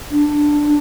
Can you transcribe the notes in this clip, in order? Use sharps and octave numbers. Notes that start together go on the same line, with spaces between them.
D4